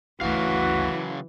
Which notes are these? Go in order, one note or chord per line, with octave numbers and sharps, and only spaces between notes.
G1 D2 C#3 E3 F#3 F#4 F5